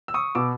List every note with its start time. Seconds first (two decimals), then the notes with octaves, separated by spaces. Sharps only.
0.08 E6
0.14 C#6 D#6
0.35 B2 D6 E6